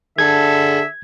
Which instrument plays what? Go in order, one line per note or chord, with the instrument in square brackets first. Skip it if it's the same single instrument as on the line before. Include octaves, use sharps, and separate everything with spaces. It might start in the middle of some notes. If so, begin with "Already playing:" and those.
[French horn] D3 [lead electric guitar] G#4 A5 [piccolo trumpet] E5 [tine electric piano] G#6